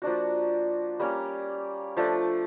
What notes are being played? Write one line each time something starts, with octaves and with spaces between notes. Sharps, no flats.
F3 A#3 D4 F#4
G3 A#3 C#4
F3 A3 D4